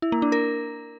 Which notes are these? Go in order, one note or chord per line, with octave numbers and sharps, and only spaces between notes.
E4
A#3
D4
A#4